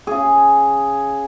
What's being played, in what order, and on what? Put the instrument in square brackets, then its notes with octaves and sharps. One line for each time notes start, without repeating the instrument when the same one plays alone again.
[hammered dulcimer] C#3 G#4